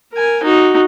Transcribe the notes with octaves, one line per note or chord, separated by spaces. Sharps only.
A#4 G#5
D#4 F#4